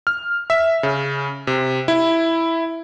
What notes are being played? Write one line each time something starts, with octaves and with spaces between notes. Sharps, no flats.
F6
E5
C#3
C3
E4